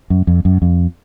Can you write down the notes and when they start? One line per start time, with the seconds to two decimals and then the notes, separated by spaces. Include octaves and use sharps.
0.10 F#2
0.27 F2
0.45 F#2
0.62 F2